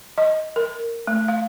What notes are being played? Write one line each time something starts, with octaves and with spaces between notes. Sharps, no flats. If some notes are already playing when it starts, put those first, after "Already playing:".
D#5
A#4
A3
F5